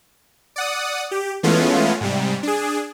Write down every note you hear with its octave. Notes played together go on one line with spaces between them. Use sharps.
D5 F#5 D#6
G4
E3 G#3 A3 B3 C#4 F4
G#2 C3 G3
D4 G#4